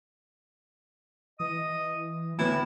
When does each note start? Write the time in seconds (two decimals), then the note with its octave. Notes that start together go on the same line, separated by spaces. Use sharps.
1.40 E3 D#5 D#6
2.39 D2 A2 B3 E4